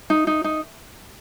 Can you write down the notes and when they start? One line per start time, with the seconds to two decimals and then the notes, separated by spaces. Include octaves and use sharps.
0.10 D#4
0.27 D#4
0.44 D#4